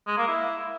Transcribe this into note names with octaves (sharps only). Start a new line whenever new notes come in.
G#3
A#3
E4